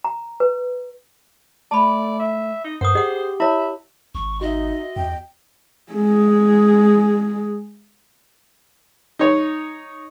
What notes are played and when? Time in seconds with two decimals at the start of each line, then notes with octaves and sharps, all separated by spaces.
0.04 A#5
0.40 B4
1.71 A3 D5 A5 B5
2.19 E5
2.64 D#4
2.81 G2 A#4 C5 F#5 D#6
2.95 G4 G#4 D#5 F#5
3.40 E4 C#5 E5 B5
4.15 G#1 C#6
4.41 D#4 F#4 D#5 E5
4.96 E2 G5
5.93 G#3 G#4
9.19 D#4 C#5